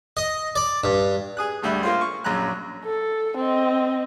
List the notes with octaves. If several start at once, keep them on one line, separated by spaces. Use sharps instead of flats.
D#5
D5
G2
G#4 D#6 F#6
G#1 D2 G3 E5 B5
A#3 F4 C5
C#6
A#1 F#2 A#5 F#6
A4
C4 D#5